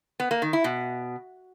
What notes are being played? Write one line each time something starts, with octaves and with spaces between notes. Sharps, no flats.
B3
A#3
D#3
E4
B2